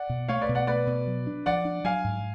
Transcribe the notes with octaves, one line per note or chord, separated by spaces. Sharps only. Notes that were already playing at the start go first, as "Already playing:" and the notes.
Already playing: D5 F#5
B2
A3 C#5 F5
B4 D5
B2
D5 F#5
A3 B4 D5
B2
F#3
D4
F3 D5 F#5
D4
F#3 F5 G#5
G#2